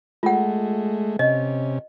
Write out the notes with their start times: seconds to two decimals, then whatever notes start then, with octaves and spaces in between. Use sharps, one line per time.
0.23 G#3 A3 F4 F#5
1.19 C3 C#4 D#5